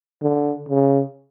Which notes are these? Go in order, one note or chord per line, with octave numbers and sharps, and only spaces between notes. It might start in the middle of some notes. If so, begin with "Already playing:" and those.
D3
C#3